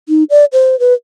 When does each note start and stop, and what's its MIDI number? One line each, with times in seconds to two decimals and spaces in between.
0.09 0.24 63
0.30 0.45 74
0.53 0.79 72
0.80 0.93 71